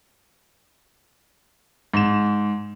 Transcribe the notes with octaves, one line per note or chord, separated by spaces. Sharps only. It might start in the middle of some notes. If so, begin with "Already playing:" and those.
G#2 E7